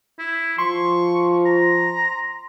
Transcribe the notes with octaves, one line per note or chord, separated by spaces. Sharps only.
E4
F3 C6 C#6
A#5